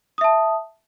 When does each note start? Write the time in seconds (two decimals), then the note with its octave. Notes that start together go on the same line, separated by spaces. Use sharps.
0.18 D#6
0.21 E5
0.24 A5